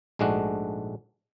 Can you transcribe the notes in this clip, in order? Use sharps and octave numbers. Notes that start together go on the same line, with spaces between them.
A#1 G#2 G#3 A3 D4 F#4